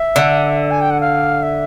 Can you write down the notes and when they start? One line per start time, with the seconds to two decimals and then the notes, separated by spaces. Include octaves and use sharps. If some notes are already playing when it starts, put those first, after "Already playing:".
Already playing: E5
0.16 D3
0.71 G#5
0.81 G5
0.90 F#5
1.01 F5
1.43 E5